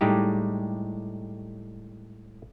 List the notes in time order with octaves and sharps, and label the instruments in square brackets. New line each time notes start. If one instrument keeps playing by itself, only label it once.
[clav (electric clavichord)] A2 G3 G#3 D#4 G4